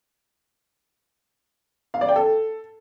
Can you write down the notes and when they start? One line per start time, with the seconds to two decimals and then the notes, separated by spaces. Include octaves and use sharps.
1.94 F5
2.01 D5
2.09 G5
2.16 A4